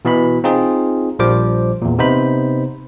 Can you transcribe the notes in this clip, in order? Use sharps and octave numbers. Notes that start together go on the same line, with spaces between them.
B2 E3 B3 F#4 B5
C4 D#4 F4 G#4
A#1 F3 G3 C5 D6
E2 A#2
C3 B3 D#4 C5 B5